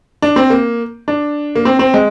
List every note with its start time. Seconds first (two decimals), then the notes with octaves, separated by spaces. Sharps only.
0.22 D4
0.36 C4
0.50 A#3
1.08 D4
1.56 A#3
1.65 C4
1.79 C4
1.94 G#3